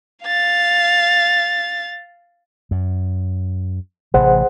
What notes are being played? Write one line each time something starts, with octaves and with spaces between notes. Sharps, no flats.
F5 A6
F#2
A1 C3 E3 G#4 C5 F#5